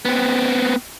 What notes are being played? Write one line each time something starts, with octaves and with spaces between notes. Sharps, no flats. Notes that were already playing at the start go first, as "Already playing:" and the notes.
B3 C4